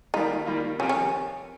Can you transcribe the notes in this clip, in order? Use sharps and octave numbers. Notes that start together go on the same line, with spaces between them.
D#3 G3 A#3 D#4 F4
D#3 G3 A#3 F4
C3 F3 C4 C#4 G4 A#4
C#4